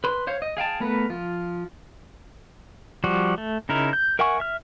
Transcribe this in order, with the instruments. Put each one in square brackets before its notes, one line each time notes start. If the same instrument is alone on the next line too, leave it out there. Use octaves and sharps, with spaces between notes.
[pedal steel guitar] B4 C6
C5 C#5 F5
D#5
G#4 F5 G5 A5
A3 B3 A#4 B4
F3 F4
F3 G3 F#4
A3
C#3 D#4 E4 A#4
G6
A#4 E5 F#5 G#5 C#6
E5 F6